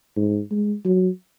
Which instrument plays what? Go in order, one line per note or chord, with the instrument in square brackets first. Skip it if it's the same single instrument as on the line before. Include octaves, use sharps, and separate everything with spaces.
[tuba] G#2
G#3
F#3